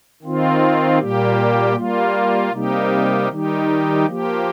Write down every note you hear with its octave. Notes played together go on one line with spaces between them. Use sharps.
D#3 C4 F4
A#2 G3 A#3 G4
G3 A#3 F4
C3 G3 A#3 D#4 G4
D#3 G3 D#4 G4
F3 A#3 G4